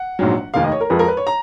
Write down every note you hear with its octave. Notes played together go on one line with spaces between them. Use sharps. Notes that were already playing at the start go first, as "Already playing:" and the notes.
Already playing: F#5
A#1 G#2 F#3
F1 D#2 D#3 F5
D#5
C#5
A#4
F2 F3 G#3 B4
A#4
B4
C#5
A#5